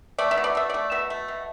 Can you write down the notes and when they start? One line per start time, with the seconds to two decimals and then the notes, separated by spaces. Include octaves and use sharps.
0.18 A3 D5
0.31 E5
0.38 B2
0.44 D5
0.55 A3 E5
0.70 A3 D5
0.92 B2 E5
1.10 A3
1.28 B2